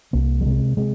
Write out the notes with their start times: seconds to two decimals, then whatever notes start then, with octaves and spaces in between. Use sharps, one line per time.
0.13 C2 A#3
0.41 G3
0.45 C3 G#3
0.77 C3 G#3